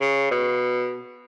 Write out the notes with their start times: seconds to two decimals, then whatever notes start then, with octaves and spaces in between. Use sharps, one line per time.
0.01 C#3
0.31 B2